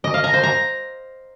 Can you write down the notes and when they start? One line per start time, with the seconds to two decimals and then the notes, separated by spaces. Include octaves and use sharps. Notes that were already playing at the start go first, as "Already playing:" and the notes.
0.04 D#5
0.14 F5
0.24 A#5
0.34 C5
0.43 A#5